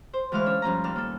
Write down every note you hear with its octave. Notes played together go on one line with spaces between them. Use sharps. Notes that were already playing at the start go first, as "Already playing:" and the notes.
C5
D2 E3 G#3 F5 C#6 F6
C#4 D4 C#5
G2 F3 C#4 A#5
D#2 D4 F6
A#3 A4